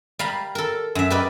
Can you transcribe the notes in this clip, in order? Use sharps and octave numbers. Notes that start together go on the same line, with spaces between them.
G3 F5 A#5 B5
A4 A#4
F#2 E5
G4 A#4 B4 D5 D#5